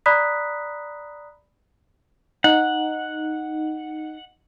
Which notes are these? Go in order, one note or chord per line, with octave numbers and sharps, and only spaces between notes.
D5 A#5 B5 D#6 F#6 B6
D#4 F#5